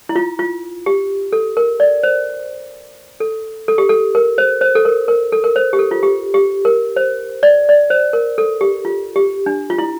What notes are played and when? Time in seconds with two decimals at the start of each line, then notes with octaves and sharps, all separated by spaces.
0.09 E4
0.16 F4
0.39 F4
0.86 G4
1.33 A4
1.57 A#4
1.80 D5
2.03 C5
3.20 A4
3.68 A4
3.78 G4
3.89 A4
4.15 A#4
4.38 C5
4.61 C5
4.75 A4
4.85 A#4
5.08 A#4
5.32 A4
5.44 A#4
5.56 C5
5.73 G4
5.79 A4
5.91 F4
6.03 G4
6.34 G4
6.65 A#4
6.96 C5
7.43 D5
7.69 D5
7.90 C5
8.13 A#4
8.38 A4
8.61 G4
8.85 F4
9.16 G4
9.46 D4
9.70 F4
9.78 E4